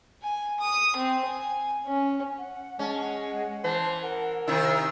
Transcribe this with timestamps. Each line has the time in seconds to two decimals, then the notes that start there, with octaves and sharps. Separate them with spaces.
0.22 G#5
0.61 D#6
0.96 C4
1.25 G#5
1.86 C#4
2.38 F#5
2.79 G#3 C#4 A5
3.00 F#5
3.64 E3 C5 A5
4.02 A#4 F#5
4.48 C3 D#3 E4 E6